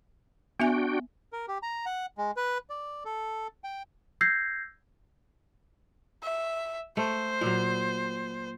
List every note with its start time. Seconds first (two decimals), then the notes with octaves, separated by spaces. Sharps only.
0.60 B3 D4 F#4 E5 G5 G#5
1.33 A#4
1.48 G4
1.63 A#5
1.86 F#5
2.18 G#3
2.36 B4
2.70 D5
3.05 A4
3.64 G5
4.21 E6 G6 G#6 A#6 C7
6.23 E5
6.97 A3 C5
7.41 A#2 F#3